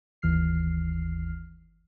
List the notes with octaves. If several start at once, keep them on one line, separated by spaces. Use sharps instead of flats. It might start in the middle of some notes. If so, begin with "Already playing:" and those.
G1 D#2 E3 F6 C7